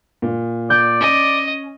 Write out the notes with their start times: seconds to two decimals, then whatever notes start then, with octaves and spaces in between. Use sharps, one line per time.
0.22 A#2
0.70 D5 G6
1.01 C#4 D#5